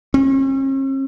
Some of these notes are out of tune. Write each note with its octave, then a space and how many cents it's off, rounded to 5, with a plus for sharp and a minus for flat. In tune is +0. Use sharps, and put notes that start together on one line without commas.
C#4 -45